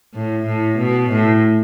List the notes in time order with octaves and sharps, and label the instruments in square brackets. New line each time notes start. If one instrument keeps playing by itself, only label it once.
[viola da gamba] A2
A2
B2
A2